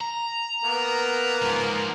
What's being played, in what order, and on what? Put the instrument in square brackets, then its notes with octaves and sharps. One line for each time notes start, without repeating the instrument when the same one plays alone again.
[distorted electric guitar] A#5
[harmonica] A#3 B3
[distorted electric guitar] G#2 F3